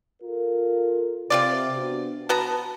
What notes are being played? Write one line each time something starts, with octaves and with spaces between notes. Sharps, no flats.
F4 A4 A#4
C3 C4 F4 D5
B3 D4 F#4
B3 F#4 A5 A#5